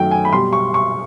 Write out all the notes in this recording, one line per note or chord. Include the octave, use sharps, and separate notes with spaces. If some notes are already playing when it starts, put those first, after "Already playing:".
Already playing: F#2 D#3 F#3 A3 G5
G#5
B5
B2 G3 C6
C#6
C#6